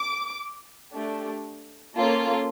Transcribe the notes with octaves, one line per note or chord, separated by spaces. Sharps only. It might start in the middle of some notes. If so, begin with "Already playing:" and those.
Already playing: D6
A3 D4 G4
A#3 C#4 F4 A4